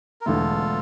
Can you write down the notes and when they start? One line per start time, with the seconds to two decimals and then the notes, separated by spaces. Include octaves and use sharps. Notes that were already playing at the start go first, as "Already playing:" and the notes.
0.21 A#4
0.26 E1 E2 D3 A3 E4 F4 A4